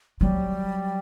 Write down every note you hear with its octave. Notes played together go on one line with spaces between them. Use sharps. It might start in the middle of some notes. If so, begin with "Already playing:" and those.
F#3 G3